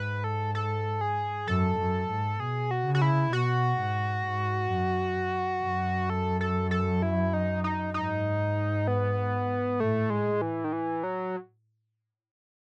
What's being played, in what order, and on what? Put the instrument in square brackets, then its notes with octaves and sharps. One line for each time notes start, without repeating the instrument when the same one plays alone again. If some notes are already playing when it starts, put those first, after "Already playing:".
Already playing: [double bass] G#2 [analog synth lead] B4
[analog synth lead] A4
A4
G#4
[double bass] F#2 [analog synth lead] A4
[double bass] F#2
G#2
[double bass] B2 [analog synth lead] G#4
[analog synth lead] F#4
[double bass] C#3
[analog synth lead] F#4
E4
[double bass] B2 [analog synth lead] F#4
[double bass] G#2
G#2
F#2
F#2
[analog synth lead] A4
A4
A4
E4
D#4
D#4
[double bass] G#2 [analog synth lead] D#4
[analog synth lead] B3
[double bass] A2 [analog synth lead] A3
[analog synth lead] G#3
E3
D#3
E3
F#3